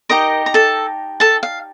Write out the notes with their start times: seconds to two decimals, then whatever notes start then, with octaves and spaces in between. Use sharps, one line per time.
0.09 D#4 G4 A#4 D#5 A#5
0.46 A#5
0.54 A4 A5
1.20 A4 A5
1.43 F5